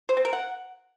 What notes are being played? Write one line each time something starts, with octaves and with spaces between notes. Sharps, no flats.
C5
C4
A#4
F#5